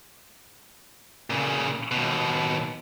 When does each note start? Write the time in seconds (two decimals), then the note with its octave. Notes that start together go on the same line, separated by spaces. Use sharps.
1.30 A#2 C#3
1.91 D#2 B2